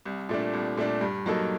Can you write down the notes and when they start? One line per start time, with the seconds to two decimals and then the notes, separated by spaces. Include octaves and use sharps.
0.06 C2
0.29 A#2 A3 D4
0.53 C2
0.77 A#2 A3 D4
1.01 G2
1.26 F#3 A#3 D#4 A4